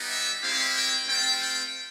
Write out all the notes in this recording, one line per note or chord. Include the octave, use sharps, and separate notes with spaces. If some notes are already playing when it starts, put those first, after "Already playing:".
Already playing: G3 B3 D#4 G4
E5
G#3 C4 E4 G4 F5
G5
A3 C4 F4 G5
G5